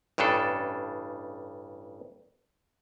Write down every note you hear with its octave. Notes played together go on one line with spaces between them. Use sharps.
A1 G2 C#3 D4 A4